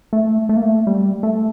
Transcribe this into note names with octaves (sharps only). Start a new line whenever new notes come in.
A3
A3
A#3
A3
G3
A3